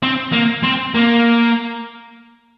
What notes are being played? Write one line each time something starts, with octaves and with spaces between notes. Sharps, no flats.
C4
A#3
C4
A#3